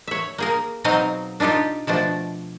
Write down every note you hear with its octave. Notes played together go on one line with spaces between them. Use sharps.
C#5 E5
A#3 G#4 A#4
B2 F#3 C4 D#4 D#5 F5
D4 D#4 F4 G4 A4
B2 F3 A3 D4